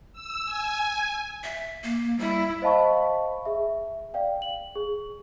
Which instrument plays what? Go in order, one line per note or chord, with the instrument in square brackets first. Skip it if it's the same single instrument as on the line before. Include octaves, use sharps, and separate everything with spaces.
[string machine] E6
G#5
[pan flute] E5
A#3
[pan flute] G3 [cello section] E4
[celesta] C5 D#5 F5 A5 B5 C#6
G#4 E5
D5 F5 G5
F#7
G#4